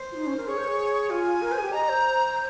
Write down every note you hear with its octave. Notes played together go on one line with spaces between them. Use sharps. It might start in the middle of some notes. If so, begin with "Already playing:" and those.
Already playing: C5
F4
D#4
C#4
A#4
G#4 C#5
C5
G#4
F4 G#5
A#4
C5
G#4
G4
D#5 A#5
C5